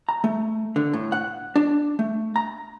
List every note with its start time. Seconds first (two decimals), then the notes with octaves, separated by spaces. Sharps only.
0.09 A#5
0.24 A3
0.76 D3
0.93 A2
1.12 F#5
1.56 D4
1.99 A3
2.36 A#5